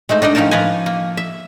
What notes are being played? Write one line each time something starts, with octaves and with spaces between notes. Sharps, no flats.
G#3 A3 D#4 C5
D4 D#4 D5 D#5
A2 F3 C#4 D#4 A#4 A5
F3 F4 B4 D#5 G#5
A#3
E5